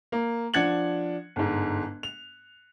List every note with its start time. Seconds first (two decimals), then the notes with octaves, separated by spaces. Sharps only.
0.12 A#3
0.54 F3 D4 F#5 G#6 C#7 F#7
1.36 G1 G#2
2.03 F7